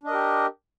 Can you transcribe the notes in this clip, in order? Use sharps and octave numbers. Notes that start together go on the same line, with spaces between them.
D4 G4 A#4 D#5